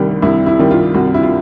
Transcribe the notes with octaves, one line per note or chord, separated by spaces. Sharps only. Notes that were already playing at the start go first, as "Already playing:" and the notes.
Already playing: C2 C3 D#3 G3
C2 E4
E4
C3 D#3 G3
F4
C2 F#4
E4
F4